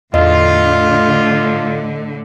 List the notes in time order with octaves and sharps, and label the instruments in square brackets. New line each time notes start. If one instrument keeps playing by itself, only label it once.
[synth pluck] E2 [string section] A2 D3 [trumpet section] F4 [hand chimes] D#5